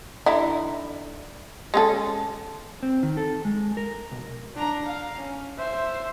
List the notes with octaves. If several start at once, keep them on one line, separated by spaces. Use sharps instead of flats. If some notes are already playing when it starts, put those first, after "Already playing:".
D3 D#4 E4
G#3 C#4 A4
C4
D#3
A4
G#3
A#4
B1
D4 A#5
F5
C#4
C5 E5